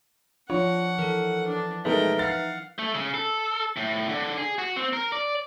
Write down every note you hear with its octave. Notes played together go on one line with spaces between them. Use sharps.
F3 D4 F4 C#5 F#5
E3 A4 A#4
D4
B2 G#3 A3 D#4 A#4 B4 E5 G5
F5 F#5 A6
A3
C#3
A4
A2
D3
G#4
F#4
C4
A#4
D5